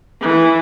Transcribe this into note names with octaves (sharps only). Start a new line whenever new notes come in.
E3